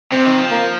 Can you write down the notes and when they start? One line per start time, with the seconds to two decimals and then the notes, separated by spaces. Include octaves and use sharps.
0.12 C3 C4
0.25 D#3
0.38 F3
0.51 A#3